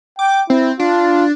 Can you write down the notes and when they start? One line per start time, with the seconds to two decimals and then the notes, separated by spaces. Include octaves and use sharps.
0.19 G5 D6
0.50 C4 E4
0.80 D4 F4